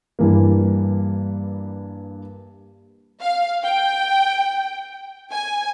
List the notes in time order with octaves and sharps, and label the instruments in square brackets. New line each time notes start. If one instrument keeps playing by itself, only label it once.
[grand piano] G2 E3 A#3
[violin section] F5
G5
G#5